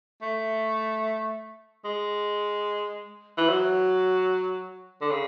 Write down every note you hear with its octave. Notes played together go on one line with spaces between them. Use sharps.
A3
G#3
E3
F#3
D3
C#3